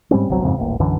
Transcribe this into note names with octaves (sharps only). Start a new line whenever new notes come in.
G#2 G3 C4 C#4
G1 C2 F#3 C4
F2 G#2 C#3 C4
D#1 A1 A#3
B1 F#2 D3 E3